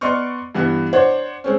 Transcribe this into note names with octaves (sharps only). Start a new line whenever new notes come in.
B3 D5 D#5 C6 C#6 F6
G2 E3 B3
D4 C5 C#5 F#5
G#3 C4 C#4